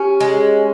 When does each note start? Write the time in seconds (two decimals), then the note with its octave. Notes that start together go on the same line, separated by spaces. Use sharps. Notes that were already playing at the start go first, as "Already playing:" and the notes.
Already playing: C#4 G4
0.20 G#3